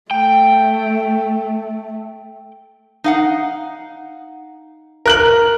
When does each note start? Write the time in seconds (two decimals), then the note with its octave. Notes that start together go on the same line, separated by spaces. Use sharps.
0.11 A3 G5
3.04 D#4 F5 F#5
5.06 A#4 F#6 F#7